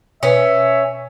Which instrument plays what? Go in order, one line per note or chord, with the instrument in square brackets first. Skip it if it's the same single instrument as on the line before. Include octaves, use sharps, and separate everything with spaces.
[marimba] B2 B4 [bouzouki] C#4 [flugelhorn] E5